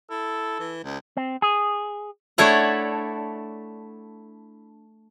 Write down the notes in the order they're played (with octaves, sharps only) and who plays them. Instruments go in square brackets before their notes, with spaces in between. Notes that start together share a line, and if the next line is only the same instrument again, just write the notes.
[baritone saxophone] E4 [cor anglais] A4
[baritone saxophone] E3
C#2
[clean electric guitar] C4
G#4
[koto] A3 D4 E4 A4 C#5 F#5